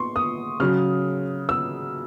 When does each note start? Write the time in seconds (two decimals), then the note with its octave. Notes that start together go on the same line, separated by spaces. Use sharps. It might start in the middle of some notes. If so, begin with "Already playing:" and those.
Already playing: C6 C#6
0.16 D#6
0.60 C#3 F#3 F6
1.49 E6